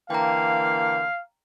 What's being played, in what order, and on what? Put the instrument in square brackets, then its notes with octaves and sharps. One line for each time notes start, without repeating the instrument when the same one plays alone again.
[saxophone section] D3 E3 A#3 [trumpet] F5 [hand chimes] G5 A#5